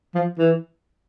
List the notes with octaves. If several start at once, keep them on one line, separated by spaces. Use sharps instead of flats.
F3
E3